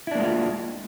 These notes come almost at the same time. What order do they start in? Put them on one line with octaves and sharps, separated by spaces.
E4 D4 A#3 G#3 F4